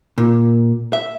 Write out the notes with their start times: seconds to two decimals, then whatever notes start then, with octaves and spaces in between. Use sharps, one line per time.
0.18 A#2
0.93 E5